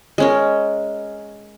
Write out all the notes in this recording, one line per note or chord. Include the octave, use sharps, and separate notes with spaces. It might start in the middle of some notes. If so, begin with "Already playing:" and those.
G#3 C#4 A#4